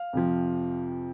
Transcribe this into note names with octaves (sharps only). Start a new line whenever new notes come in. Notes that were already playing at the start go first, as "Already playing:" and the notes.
Already playing: F5
F2 C3 F3